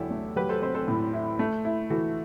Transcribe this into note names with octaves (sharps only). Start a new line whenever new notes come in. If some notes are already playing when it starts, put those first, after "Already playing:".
Already playing: E2 D3 F#3 E4 G4 A4
A3
F#3 G4 B4
A4 C5
C4 A4 C5
A4 C5
A2
E4
A3
E4
E3 F#4 A4